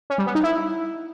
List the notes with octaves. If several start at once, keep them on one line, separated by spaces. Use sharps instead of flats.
C#4
G3
B3
D#4
E4